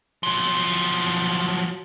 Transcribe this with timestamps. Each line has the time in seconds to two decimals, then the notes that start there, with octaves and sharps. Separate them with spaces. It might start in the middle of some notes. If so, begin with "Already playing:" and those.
0.23 F3 F#3